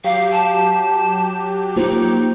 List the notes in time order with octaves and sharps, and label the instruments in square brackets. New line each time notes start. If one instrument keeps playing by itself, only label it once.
[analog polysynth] F#3 G4 [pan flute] F5
[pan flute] A5
[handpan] A#3 F4 C5 [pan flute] D#4